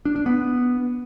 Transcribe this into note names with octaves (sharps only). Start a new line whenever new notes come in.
D4
D4
B3